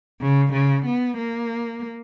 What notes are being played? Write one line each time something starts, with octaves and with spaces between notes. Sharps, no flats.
C#3
C#3
B3
A#3